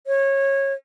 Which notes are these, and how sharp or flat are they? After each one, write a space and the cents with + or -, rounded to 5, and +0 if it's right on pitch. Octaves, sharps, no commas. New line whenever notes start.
C#5 -20